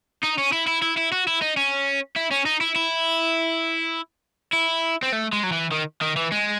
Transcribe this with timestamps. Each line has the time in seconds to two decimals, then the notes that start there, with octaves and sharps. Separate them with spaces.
0.24 D#4
0.39 C#4
0.53 E4
0.68 E4
0.82 E4
0.97 E4
1.12 F#4
1.27 E4
1.42 D#4
1.57 C#4
2.16 E4
2.31 C#4
2.46 D#4
2.61 E4
2.76 E4
4.53 E4
5.03 C4
5.13 A3
5.33 G#3
5.44 F#3
5.52 E3
5.72 D#3
6.02 D#3
6.17 E3
6.32 G#3